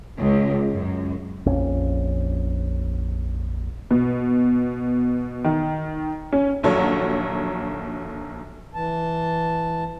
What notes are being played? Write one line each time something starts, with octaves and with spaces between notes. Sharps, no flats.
C#2
F#2
A#1 F2 C#4
B2
D#3
C#4
A#1 D#2 F#3 A4 C#5
E3 A5